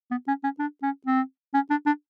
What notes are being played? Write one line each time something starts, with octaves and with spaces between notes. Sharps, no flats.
B3
C#4
C#4
D4
C#4
C4
C#4
D4
D4